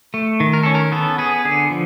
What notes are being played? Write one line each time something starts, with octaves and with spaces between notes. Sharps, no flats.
A3
D#3
A#4
C#4 A4
A#4
B3 A4
B3 G#4
D3 G#4
F3